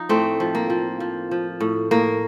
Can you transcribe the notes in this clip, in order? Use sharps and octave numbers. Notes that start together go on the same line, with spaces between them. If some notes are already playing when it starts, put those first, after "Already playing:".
Already playing: F3 D#4
A2 A3 C4
F3
A#3
F3
F3
F3
A2
A2 A#3